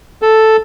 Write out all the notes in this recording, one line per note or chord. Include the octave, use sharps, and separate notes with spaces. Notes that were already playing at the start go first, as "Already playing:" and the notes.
A4